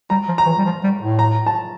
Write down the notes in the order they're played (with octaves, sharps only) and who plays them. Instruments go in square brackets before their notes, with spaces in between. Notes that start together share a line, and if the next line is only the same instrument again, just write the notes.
[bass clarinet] G3 [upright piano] A#5
[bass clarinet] F3
[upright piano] A#5
[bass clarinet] E3
G3
F3
G3
A2
[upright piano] A#5
A5